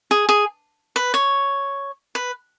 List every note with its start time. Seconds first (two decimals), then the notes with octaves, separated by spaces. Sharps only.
0.11 G#4
0.29 G#4
0.96 B4
1.14 C#5
2.15 B4